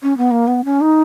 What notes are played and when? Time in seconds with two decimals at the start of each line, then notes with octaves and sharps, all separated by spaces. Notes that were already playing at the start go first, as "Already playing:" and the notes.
0.03 C#4
0.17 B3
0.31 A#3
0.48 B3
0.65 C#4
0.81 D#4